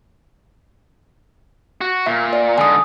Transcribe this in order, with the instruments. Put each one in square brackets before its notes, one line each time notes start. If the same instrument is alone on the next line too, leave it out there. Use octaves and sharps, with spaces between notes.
[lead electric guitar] F#4
[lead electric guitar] A#2 [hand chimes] E5
[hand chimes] D5
[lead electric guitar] G#2 D3 [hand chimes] G#5 D#6